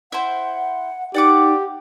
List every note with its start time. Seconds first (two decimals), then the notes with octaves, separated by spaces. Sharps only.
0.12 E4 C5 F#5
1.14 D#4 G4 D5 F#5 D6